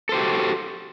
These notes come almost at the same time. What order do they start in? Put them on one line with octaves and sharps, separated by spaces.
A4 C5 G4 F#4